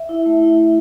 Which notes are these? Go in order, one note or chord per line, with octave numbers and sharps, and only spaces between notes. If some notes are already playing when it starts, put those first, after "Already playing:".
Already playing: E5
E4
A3
E4
A3